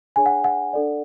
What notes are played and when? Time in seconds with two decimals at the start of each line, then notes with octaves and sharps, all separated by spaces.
0.16 D4 G#4 C#5 G#5
0.26 F#5
0.44 F#5
0.73 D4 A4 D5